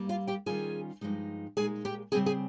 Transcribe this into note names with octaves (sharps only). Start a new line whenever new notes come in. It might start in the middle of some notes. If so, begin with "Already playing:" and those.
Already playing: G2 G3 A#3
F4 F5
G4 G5
D#3 G3 C#4 F4 G#4 G#5
G2 F3 G#3 D#4
A#2 G#3 D#4 G#4 G#5
G4 G5
C#3 G3 C4 G#4 G#5
G#4 G#5